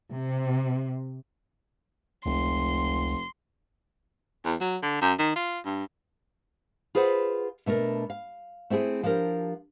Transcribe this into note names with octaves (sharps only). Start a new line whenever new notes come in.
C3
F1 C#2 C6
E2
F#3
D3
F#2
D#3
F4
G2
F4 G#4 B4 C5 F#5
B2 A3 D4 A#4
F5
A3 C4 E4 G#4
F3 D4 G4 A#4